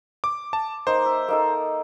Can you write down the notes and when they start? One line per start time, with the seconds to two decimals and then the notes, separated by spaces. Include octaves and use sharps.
0.24 D6
0.53 A5
0.87 A#3 D#4 C5
1.05 E5
1.28 A#3 D#4 A4